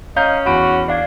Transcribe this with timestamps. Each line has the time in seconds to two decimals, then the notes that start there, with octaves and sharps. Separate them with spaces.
0.16 C#4 D#5 F5 A#5 G6
0.46 E2 F#4 B5 D7
0.88 D4 D5 F5 G#6